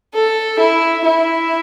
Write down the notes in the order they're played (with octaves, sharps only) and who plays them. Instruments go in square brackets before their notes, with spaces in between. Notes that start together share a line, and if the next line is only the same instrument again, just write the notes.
[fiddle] A4
E4
E4